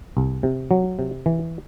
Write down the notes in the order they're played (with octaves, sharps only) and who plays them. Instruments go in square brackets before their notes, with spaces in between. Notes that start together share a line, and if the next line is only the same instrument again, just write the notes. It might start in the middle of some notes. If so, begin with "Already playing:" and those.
[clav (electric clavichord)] C2
C3
F#3
C3
E3